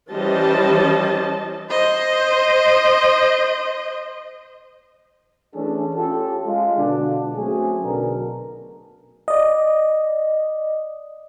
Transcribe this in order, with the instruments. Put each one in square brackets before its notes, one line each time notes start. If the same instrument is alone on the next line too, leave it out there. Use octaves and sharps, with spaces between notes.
[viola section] E3 G3 C#4 C5 D#5 A5
[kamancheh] C5 D#5
[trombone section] E3 A3 C#4 D4 G#4 A4
C#4 F4 G4 A4
G#3 F4
B2 D3 D4
F#3 A3 C4 C#4 G#4
B1 B2 D3 D4 A#4
[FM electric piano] D5 D#5